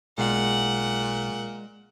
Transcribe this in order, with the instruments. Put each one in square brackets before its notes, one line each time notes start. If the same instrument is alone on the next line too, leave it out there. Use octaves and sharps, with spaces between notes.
[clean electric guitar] B1 [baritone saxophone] A#2 [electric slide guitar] G#3 [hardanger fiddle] F#5